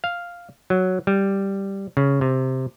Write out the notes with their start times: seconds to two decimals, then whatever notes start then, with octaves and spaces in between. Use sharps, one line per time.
0.04 F5
0.70 F#3
1.07 G3
1.97 C#3
2.21 C3